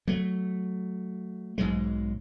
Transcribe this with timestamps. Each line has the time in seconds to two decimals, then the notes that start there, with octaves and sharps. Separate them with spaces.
0.08 F#3 A3
1.58 B1 G#2 F#3 G#3